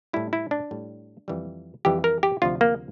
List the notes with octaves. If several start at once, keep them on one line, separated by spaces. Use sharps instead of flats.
A2 G3 E4
E4
D4
A2 G3
F2 E3 G3
F2 E3 G3 G4
A#4
G4
D2 C3 F3 F4
A#3